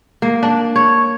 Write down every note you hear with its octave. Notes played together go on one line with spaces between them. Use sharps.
A#3
D4
C#5